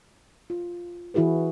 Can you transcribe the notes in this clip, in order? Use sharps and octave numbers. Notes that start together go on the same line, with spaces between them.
F4
E3 E4 F#4 G#4 B4